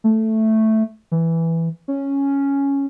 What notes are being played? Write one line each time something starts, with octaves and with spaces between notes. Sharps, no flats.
A3
E3
C#4